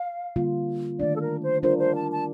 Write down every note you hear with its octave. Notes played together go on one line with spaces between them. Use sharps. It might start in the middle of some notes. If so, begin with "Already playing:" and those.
Already playing: F5
D3 G3 A#3 F4
D#3 A3 D4 D5
A4
A#4
C5
G3 D4 F4 A#4 C5
C5
A5
A5